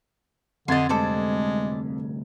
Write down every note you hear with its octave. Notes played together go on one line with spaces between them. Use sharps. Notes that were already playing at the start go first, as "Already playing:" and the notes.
F2 D3 D#5 C6 G#6 A6
D2 G2 C3 G#3 A4 C5 D5